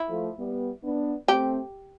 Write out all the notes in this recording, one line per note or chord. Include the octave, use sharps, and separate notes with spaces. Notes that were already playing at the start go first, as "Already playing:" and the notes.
Already playing: E4
F3 A3
G3 B3
B3 D4
A3 C4 G4